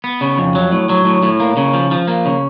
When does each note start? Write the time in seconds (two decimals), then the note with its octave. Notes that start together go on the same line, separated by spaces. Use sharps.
0.04 B3
0.21 C#3
0.38 F2
0.55 F#3
0.72 A2
0.89 F#3
1.05 A2
1.23 A2
1.40 A#3
1.57 C#3
1.74 F3
1.91 F3
2.08 A#3
2.25 C#3